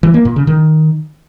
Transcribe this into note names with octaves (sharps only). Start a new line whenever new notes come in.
E3
A#3
A#2
C#3
D#3